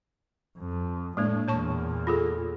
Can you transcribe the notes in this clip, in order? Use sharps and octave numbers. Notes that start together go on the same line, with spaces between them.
F2
A2 G#3 A#3 D4
E2 A#2 C#5 A5 C#6
F4 G#4 A4